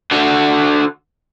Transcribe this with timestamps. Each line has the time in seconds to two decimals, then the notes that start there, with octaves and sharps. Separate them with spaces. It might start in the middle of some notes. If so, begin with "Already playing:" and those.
0.12 D3 F#4